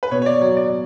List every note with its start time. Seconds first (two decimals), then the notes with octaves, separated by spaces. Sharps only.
0.03 B4
0.11 B2 C#5
0.22 C#5
0.26 D5
0.41 F#3 C#5
0.57 D5